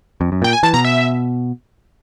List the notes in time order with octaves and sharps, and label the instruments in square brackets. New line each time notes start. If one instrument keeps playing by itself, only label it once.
[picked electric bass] F2
F#2
[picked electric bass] A#2 [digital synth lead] G5
[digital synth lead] G#5
[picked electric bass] E3 [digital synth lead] A5
[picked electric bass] B2 [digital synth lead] A#5
[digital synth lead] E5